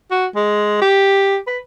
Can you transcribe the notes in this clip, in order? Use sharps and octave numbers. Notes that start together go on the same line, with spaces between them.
F#4
G#3
G4
B4